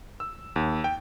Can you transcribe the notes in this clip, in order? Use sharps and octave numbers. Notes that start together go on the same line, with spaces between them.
E6
D#2
G5